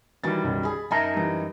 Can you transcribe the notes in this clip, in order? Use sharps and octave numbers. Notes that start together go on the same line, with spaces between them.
D#3 E3 G3 F#4 A6
B1 F#2
G#4 B5
F#2 D#4 A#4 E5 G#5 A5
E3 G3